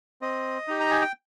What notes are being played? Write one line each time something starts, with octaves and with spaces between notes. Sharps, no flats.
C4 D#5
D#4 G4
A#5
G#5
G5